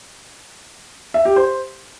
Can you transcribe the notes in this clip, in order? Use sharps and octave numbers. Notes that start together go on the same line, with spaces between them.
E5
G4
C5